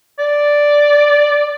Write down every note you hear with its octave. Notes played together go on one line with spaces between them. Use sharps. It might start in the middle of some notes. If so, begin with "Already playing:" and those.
D5